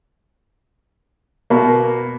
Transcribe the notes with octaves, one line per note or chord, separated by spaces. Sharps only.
B2 A#3